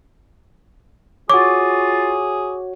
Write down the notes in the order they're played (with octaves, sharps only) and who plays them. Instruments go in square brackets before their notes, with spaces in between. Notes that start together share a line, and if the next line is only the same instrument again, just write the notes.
[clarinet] F4 [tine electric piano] F#4 C#5 [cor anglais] G#4 [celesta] D6